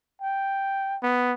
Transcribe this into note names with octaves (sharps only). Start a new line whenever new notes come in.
G5
B3